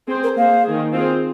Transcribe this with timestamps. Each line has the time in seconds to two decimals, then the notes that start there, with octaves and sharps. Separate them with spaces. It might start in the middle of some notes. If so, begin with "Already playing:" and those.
0.08 C4 G#4 C5
0.23 A#4
0.37 A#3 G#4 C5 F5
0.65 D#3 A#3 G#4
0.93 C4 F4 G#4 C5